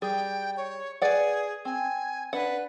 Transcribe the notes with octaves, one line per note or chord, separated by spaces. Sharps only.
G3 G#4 G5
C#5
G#4 B4 D5 F#5
C4 G#5
D4 B4 F#5